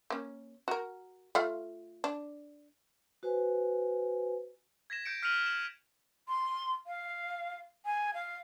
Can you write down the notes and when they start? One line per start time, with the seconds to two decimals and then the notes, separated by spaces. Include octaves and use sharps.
0.10 A#3 C#4
0.68 F#4 A#4
1.35 A3 F4 F5
2.04 D4
3.23 F#4 B4 C5 G#5
4.90 G#6 A#6 B6 E7
5.06 G6 C#7 D7
5.23 F6 B6 C#7 D#7 F7 F#7
5.46 E7 F#7
6.28 C6
6.87 F5
7.86 G#5
8.14 F5